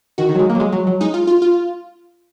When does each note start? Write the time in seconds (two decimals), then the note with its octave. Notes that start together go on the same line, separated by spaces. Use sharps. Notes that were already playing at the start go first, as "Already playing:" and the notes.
0.18 D#3 F#4
0.29 D#3
0.35 F#3
0.39 G#3
0.50 A#3
0.55 F#3
0.60 G#3
0.72 F#3
0.87 F#3
1.01 G#3 D#4
1.14 F4
1.27 F4
1.42 F4